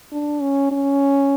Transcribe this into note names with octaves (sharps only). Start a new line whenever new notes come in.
D4
C#4
C#4